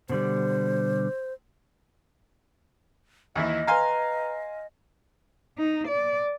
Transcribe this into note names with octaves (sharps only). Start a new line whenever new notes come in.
B2 D3 G3 C5
D#2 E3 E4 D#5
B4 F5 G#5 A#5 C6
D#4
D5